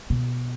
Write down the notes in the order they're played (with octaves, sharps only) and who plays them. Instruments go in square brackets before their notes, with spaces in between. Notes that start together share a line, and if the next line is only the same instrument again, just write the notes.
[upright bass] B2